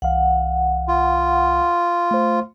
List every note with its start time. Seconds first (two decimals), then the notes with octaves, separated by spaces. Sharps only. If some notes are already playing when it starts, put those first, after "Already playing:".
0.02 C2 E3 F5 F#5
0.88 F4
2.11 A3 C5